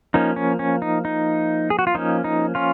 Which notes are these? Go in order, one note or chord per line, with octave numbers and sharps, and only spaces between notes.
F3 A#3 C#4 D#4
C#4
C#4
D#4
D#4
G#4
F#4
F4
F3 A#3 C#4 D#4
D#4
C#4 F4